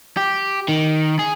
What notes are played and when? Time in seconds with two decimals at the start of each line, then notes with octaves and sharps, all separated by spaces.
0.17 G4
0.68 D#3
1.19 G#4